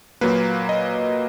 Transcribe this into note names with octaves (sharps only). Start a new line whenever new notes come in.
A#2 F#3 A#3 B4
D#5